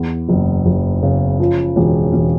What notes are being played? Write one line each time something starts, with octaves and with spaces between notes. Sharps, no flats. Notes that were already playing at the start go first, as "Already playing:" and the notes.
Already playing: E2
F#1
F#1
C#3
F3
E1
E1